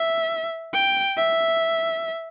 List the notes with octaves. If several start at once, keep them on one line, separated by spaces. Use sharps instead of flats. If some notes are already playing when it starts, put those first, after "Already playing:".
Already playing: E5
G5
E5